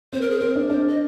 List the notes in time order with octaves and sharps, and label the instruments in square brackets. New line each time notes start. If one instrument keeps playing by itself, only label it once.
[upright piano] C4 [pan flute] C5
[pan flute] A#4
G#4
[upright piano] C4 [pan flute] A#4
[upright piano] D4
[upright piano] D4 [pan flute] C5
[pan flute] D#5